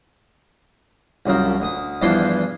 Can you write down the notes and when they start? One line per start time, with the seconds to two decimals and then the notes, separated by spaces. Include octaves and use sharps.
1.26 C2 F#2 F3 A#4
1.60 D2 D#6
2.02 E2 G2 E3 F3 D4 C6